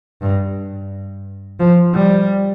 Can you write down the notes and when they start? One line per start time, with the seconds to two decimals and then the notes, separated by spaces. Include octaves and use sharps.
0.22 G2
1.60 F3
1.94 G3